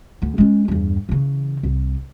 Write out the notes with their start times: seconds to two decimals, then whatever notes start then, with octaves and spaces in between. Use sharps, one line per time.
0.22 D2 B3
0.38 G#3 C#4
0.68 E2 G2
1.09 C#3 E3
1.63 C2